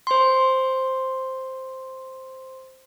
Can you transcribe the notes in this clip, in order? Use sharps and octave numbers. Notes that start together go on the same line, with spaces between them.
C5 C6